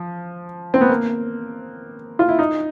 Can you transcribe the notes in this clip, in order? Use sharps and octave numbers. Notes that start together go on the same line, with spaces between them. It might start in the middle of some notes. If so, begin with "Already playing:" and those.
Already playing: F3
C4
B3
A#3
F4
E4
D#4